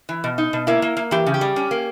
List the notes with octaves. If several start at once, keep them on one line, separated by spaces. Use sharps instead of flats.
E3
B2
D#4
B2
A#3 E4
A#3
A#3
E3 G4
C#3
G4
G3
C#4
A#3